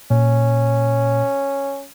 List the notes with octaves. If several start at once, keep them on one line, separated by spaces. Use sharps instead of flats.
A#2 C#4